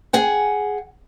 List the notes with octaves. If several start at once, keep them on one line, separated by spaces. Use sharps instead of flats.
G#4 F#5 G5